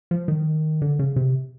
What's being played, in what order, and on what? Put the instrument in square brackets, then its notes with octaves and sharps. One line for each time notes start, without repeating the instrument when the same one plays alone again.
[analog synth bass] F3
D#3
D3
C#3
C3